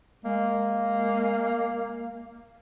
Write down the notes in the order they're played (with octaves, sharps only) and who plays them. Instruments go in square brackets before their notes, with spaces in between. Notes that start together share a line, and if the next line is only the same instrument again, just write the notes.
[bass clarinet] G#3 [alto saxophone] A#3